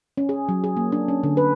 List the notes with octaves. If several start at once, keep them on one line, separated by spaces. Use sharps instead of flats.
C#4
G#4
F#3
G#4
A#3
D4
C#4
D3
B4